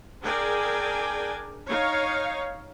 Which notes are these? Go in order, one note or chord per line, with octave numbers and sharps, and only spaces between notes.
D4 G#4 A#4 D5 G5 G#5
D#4 C#5 F5